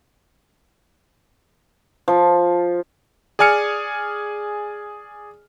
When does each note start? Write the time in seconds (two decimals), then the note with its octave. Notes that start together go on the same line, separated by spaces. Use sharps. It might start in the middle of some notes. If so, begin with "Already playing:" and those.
2.08 F3
3.39 G#4 D5 G#5 F6 C#7